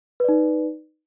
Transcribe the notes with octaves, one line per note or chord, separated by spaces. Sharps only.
D#4 B4 D5